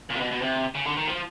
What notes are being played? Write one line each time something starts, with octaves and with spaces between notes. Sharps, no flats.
A#2
C3
B2
B2
C3
C#3
D3
D#3
F3